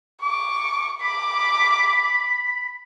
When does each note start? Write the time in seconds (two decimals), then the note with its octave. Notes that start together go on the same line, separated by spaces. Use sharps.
0.22 C#6 D6
1.01 B5 D6